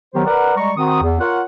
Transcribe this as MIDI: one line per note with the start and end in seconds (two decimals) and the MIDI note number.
0.14 0.23 51
0.14 0.23 54
0.14 0.23 59
0.14 0.23 67
0.14 0.23 72
0.26 0.56 70
0.26 0.56 71
0.26 0.56 74
0.26 0.56 78
0.57 0.72 55
0.57 0.72 56
0.57 0.72 82
0.57 0.72 85
0.77 1.02 51
0.77 1.02 60
0.77 1.02 66
0.77 1.02 87
1.03 1.18 40
1.20 1.42 65
1.20 1.42 70
1.20 1.42 73
1.20 1.42 78